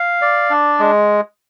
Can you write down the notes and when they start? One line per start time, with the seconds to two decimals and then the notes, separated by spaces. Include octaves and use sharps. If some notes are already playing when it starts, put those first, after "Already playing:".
Already playing: F5
0.22 D5
0.50 D4
0.79 G#3